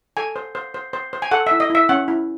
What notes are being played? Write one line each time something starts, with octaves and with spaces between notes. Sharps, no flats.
A4 G#5
C5
C5
C5
C5
C5
G#5
A4 F#5
E5
E4
D#5
E4 E5
C#4 F#5
E4